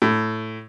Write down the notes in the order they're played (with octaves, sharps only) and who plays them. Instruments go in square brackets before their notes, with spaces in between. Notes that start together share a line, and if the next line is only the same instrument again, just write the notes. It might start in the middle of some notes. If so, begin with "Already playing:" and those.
[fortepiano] A2